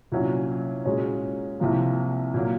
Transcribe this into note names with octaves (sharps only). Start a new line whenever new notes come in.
C2 A#2 F#3 C#4
A#2 G#3 C#4 F#4 C#5
C2 C3 F3 A#3
A#2 F#3 A#3